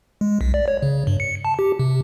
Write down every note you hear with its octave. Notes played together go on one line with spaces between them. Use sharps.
G#3
B1
D5
C#5
C#3
G2
C#7
A5
G4
C3